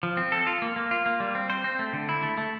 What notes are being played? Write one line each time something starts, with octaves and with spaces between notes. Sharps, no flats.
F3
C4
A4
F4
A#3
A#3
F4
A#3
G3
C4
C5
C4
A3
D3
E4
A3
A3